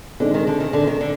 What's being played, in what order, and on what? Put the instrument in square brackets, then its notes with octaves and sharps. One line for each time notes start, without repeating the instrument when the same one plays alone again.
[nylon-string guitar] D3 [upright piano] G#3 C4 D#4
[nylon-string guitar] D#3
D3
D#3
D3
D#3
D3